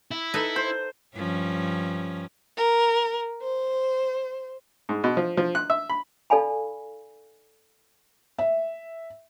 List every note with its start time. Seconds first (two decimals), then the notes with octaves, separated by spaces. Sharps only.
0.11 E4
0.34 D#4 A4 B4
0.56 C5
1.16 G2 F3 C#4
2.57 A#4
3.42 C5
4.89 G#2
5.04 B2
5.17 F3
5.37 F3
5.55 F#6
5.70 E5
5.90 B5
6.30 D#4 A4 D5 F5 G#5 B5
8.38 E5